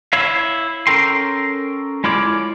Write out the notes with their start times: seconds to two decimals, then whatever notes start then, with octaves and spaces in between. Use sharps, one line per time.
0.13 E4 C#5 F5
0.87 C#4 A4 A#4 G5 C6
2.04 G#3 E4 F4 C#5 D5